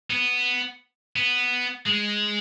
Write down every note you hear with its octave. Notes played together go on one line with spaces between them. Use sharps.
B3
B3
G#3